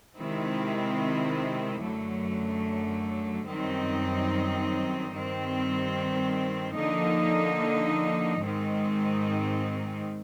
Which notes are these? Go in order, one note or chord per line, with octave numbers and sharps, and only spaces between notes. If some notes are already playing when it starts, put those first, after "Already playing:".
C3 D#3 G#3 C4 E4
F#2 D3 F#3 A3
F#2 D#3 G3 C4 D#4
G2 D#3 G3 C4
D3 F3 A#3 D#4
G#2 D#3 G#3 C4 D#4